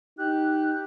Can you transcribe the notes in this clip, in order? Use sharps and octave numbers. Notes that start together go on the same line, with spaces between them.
D#4 G4 F#6